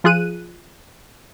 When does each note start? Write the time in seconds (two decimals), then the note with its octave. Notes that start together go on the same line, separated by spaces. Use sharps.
0.04 F3 F4 G#4 F#6 D#7